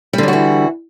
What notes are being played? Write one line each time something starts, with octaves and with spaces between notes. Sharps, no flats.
D3 E3 F#3 G3 F#4